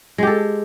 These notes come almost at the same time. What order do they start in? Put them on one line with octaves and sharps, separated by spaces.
G#3 G4 A4